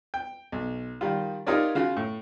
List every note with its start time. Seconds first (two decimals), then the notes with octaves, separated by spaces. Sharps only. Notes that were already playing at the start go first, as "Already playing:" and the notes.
0.14 G5
0.52 B1
1.01 D#3 G3 F4
1.46 D#4 F4 G4 A#4 C#5 D5
1.75 C#3 F4 F#4
1.97 A2